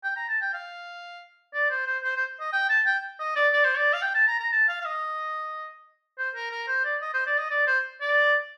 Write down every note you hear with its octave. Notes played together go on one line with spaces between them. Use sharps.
G5
A#5
A5
G5
F5
D5
C5
C5
C5
C5
D#5
G5
A5
G5
D#5
D5
D5
C5
D5
F5
G5
A5
A#5
A#5
A5
F5
F5
D#5
C5
A#4
A#4
C5
D5
D#5
C5
D5
D#5
D5
C5
D5